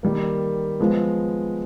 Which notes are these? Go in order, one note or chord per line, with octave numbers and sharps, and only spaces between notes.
D#3 G3 A#3
F3 G#3 B3